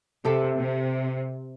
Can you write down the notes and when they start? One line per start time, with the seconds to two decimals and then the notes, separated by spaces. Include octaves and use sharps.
0.24 C3 G4 A4 E5
0.59 C3